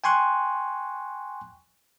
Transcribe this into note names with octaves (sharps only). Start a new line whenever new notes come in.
G5 G#5 C6 C#6 F#6